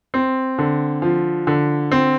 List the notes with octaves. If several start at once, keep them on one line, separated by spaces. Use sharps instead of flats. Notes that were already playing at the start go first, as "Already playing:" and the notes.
C4
D3
F3
D3
C4